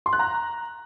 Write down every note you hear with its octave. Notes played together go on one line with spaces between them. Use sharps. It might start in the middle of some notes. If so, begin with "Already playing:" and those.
C6
F#6
A#5